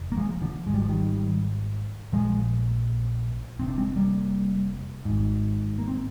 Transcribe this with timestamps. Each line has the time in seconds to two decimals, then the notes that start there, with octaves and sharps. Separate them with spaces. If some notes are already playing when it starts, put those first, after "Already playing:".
Already playing: F1
0.12 A#3
0.17 F3 G#3
0.41 D3 F3
0.66 G#1 G#2 G#3
0.74 G3
0.81 F3
0.88 D#3 G3
2.12 A#1 A#2 F3 G#3
3.59 F1 F2 C3 C4
3.68 D4
3.78 G#3 C4
3.96 G3 A#3
5.05 G#1 G#2
5.79 A#3
5.88 C4